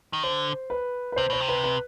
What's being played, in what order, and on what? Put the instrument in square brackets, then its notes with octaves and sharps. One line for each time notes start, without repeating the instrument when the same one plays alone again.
[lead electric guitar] D#3
[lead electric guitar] D3 [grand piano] C5
[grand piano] B4
B4
[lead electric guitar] C3 [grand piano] C5
[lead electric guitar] B2 [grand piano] C5
[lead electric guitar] C3
[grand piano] B4
B4